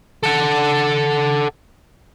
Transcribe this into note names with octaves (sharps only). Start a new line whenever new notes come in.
A4 F#5